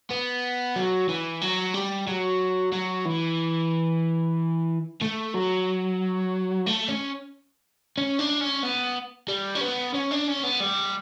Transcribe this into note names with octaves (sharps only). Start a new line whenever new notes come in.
B3
F#3
E3
F#3
G3
F#3
F#3
E3
A3
F#3
A3
C#4
C#4
D4
C#4
B3
G3
C#4
B3
C#4
D4
C#4
B3
G3